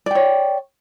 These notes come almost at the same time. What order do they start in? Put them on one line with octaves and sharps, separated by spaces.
D5 G5 C#5